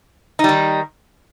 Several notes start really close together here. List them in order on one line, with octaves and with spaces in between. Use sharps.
D#4 G3 D#3